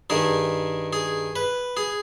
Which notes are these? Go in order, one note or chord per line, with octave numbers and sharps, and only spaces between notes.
G2 D#3 G#4
G#4
B4
G#4